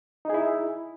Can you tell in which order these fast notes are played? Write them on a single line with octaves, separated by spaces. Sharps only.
D#4 G#4 E4